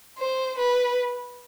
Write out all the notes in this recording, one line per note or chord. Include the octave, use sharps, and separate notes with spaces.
C5
B4